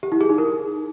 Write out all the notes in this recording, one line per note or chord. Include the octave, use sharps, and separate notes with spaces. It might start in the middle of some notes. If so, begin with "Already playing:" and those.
G4
E4
G#4
D#4
A#4